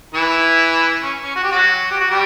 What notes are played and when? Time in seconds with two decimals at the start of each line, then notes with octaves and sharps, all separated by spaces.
0.14 E3 E4
1.03 C#4
1.24 C#4
1.36 F#4
1.44 G4
1.51 F#3 F#4
1.91 G4
2.00 F#4
2.11 G3 G4